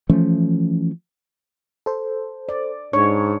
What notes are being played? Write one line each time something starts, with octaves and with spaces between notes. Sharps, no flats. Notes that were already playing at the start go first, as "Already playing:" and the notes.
E3 F3 A3 C#4
A4 C5
D5
G#2 D4 C#5 C#6